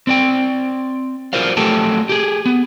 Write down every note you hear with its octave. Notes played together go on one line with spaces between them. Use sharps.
C4 D5 G5
F4 F#4 A#4 C5 D5 F5
F#3 A3 G4 A4 G5 A5
G4 G#4
B3